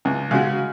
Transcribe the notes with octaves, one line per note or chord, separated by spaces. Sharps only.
C#2
C#3 G#3 F#4